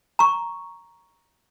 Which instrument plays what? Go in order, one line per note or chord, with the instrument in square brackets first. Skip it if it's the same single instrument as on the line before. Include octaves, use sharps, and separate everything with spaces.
[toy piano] A#5 C#6